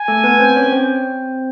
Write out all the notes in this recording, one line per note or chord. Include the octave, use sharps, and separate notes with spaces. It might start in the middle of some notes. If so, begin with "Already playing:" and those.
Already playing: G#5
A3 A4
B3 B4
C4 C5
C#4 C#5
C4 C5